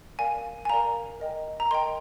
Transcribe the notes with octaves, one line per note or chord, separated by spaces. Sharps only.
A#4 D5 F5 G#5
G#5
A#4 D5 F5 A#5
A#4 D#5 G5
A#5
A#4 D#5 G5 C6